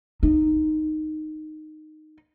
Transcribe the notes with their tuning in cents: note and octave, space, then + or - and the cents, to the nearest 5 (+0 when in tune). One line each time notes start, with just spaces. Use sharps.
D#4 -10